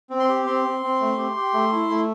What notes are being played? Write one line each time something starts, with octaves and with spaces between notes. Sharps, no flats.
C4
C6
G4
C4 C6
C4
C4
A3
G4
G4
A3
E4
A3